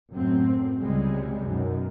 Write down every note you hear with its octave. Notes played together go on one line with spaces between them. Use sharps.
F#2 A2 C4
C#2 C3 G3 G#3
F#2 B2 D#3